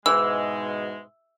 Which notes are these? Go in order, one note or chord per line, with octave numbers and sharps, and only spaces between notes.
G#2 B2 E3 G#3 E6